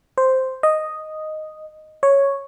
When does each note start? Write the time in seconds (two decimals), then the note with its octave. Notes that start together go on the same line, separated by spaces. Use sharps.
0.18 C5
0.63 D#5
2.03 C#5